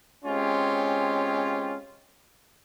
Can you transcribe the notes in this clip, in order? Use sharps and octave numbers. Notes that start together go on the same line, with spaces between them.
G#3 C4 C#4 F4 G4